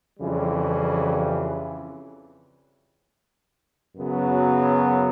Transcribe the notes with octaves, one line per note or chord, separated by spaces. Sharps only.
F2 C#3 E3 G3
F#2 C#3 F#3 B3